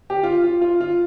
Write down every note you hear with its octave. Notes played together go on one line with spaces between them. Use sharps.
G4
F4
F4
F4
F4